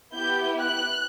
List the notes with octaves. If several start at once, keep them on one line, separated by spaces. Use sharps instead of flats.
B3 E4 G4 G6
F#6